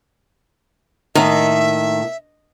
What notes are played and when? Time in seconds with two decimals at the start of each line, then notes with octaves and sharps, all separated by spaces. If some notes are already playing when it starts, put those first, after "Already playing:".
1.15 A2 D#3 A#3 E5